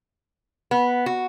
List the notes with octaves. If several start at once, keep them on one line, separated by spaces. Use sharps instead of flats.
B3
F#4